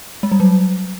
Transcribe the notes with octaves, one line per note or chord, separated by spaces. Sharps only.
G#3
G3
F#3